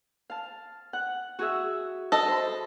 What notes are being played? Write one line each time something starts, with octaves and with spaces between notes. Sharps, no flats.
F5 A5
F#5 F#6
F#4 G#4 E5
A4 D#5
C5 B5